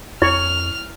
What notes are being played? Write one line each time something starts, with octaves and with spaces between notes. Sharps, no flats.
F2 E4 C#5 F6 F7